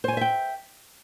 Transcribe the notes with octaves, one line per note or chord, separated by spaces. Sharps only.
C5 C#5 E5 G5 G#5